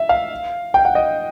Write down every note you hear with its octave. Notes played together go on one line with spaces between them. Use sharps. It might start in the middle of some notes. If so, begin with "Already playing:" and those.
Already playing: E5
F5
G5
F#5
D#5